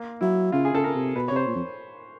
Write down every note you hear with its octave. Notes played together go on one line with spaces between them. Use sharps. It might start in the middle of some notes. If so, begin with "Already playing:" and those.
Already playing: A#3
F#3 E4
C#3 F4
G#4
C#3 A4
C#3 A#4
C3
B2 B4
C3 C#5
C5
A#2
F2